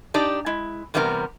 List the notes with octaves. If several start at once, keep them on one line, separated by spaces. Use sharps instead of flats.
D4 D#4 G4 D5
G#3 E4
E2 C3 G3 B3 F4 A#4